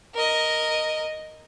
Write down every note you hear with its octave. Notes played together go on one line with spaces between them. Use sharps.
A#4 D#5